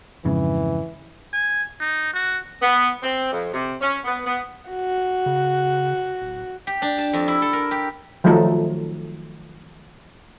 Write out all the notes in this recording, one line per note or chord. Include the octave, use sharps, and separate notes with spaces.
F2 G#2 C#3 E3
G#5
D#4
F#4
B3
C4
F2
C3
C#4
B3
B3
F#4
C#3
D1
G4
D4
A5
F2
E4
A4
A#4
G4
D#3 F3 F#3 A3 D#4 A4